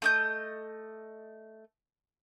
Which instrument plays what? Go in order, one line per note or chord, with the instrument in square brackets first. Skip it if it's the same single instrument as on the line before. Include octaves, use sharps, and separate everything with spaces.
[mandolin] A3 D#5 G6